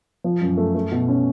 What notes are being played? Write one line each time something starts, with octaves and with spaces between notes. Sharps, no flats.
F3
F#2
A3
A3
B2
C#4